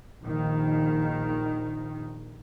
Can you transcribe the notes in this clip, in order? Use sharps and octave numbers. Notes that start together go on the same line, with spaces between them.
A#1 D#3